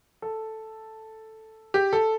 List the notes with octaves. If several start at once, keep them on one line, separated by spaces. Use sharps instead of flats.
A4
G4
A4